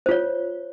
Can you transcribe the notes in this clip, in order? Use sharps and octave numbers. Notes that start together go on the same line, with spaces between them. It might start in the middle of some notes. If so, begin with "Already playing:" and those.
F4 C5 C#5